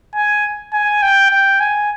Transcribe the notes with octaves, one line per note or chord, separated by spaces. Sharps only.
G#5
G#5
G5
G5
G#5